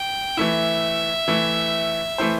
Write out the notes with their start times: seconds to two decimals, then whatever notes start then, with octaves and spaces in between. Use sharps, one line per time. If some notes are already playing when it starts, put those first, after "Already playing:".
Already playing: G5
0.37 E3 A3 E4 E5
1.28 E3 A3 E4
2.18 E3 A3 E4 C5